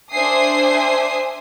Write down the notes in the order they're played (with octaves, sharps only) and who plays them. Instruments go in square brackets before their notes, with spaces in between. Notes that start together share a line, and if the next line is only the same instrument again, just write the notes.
[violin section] D4 C5 E5 G#5 D#6 C7